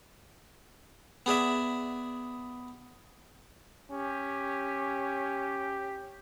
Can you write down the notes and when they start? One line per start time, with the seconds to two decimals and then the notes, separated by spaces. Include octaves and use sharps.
1.26 B3 G#4 D5 E5
3.90 C#4 G4